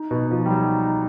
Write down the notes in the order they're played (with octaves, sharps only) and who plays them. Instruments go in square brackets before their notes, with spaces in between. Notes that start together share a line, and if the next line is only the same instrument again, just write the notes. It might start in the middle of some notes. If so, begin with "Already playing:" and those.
Already playing: [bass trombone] D#4
[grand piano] B2
F3
G3
F#3